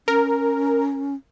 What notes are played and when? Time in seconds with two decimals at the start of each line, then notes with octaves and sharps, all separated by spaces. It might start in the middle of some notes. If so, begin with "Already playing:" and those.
0.08 C#4 A#4